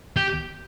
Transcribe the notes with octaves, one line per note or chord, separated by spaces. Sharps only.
G4